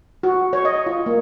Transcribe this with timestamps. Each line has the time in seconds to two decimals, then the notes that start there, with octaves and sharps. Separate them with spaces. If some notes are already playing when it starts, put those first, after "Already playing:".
0.23 F#4
0.53 C#5
0.65 D#5
0.86 F4
1.06 A#3